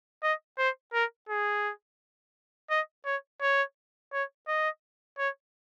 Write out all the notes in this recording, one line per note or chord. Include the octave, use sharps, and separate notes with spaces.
D#5
C5
A#4
G#4
D#5
C#5
C#5
C#5
D#5
C#5